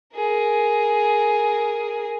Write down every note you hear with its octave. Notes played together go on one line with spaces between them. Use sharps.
G#4 A#4